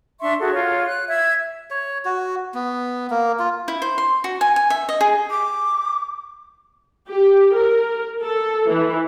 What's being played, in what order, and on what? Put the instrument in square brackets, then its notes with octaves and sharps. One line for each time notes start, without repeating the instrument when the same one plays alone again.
[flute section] D4 E5 C6 C#6
F#4 G#4 A4
F4 C#5
F#6
E5 G#6
[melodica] C#5
F#4
B3
A#3
F4
[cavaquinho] E4
C5
C6
F#4
G#5
G#5
E5
D#5
G#4
[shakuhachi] D6
[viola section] G4
A#4
A4
E3